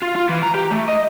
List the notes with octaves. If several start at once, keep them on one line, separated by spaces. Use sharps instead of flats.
F4
F4
E3
A#5
G4
A3
D#5